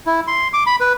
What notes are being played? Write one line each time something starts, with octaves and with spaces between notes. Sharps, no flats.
E4
C6
D6
B5
B4